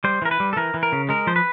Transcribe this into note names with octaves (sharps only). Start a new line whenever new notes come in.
G3 C5
E3 A#4
B4
G3
A4
E3 A#4
E3
A#4
C#3
G#3 A#4
F3 C5
B4